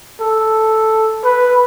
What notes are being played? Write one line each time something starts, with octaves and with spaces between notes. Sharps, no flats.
A4
B4